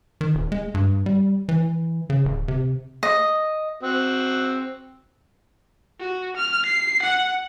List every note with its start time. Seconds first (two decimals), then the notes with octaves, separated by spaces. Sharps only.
0.21 D#3
0.35 D#1
0.52 G#3
0.74 G2
1.06 G3
1.49 E3
2.10 C#3
2.25 D1
2.48 C3
3.03 D#5
3.81 C4 F#4
6.00 F#4
6.37 F6
6.66 C7
7.03 F#5